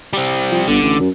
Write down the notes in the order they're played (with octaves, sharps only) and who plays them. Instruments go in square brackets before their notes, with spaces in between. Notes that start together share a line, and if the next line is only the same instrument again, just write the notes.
[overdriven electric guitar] G3 C4
[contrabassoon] F3
[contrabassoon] G1 [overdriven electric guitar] D3
[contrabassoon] A1
F#2